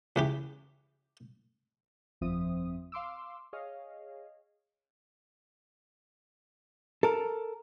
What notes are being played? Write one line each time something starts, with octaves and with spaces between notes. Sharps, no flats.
C#2 E3 G4
G1 F2 F3 C4 E5 D#6
F5 C6 D6 E6
G#4 C#5 D#5 F5
A4 A#4